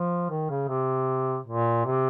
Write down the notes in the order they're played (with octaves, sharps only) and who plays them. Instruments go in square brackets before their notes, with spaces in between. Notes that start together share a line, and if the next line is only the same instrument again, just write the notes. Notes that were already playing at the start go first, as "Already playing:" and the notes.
Already playing: [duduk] F3
D#3
C#3
C3
A#2
C3